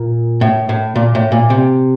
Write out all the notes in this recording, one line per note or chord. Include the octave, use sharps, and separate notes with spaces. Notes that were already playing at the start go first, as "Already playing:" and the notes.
Already playing: A#2
A2
A2
A#2
A2
A#2
C3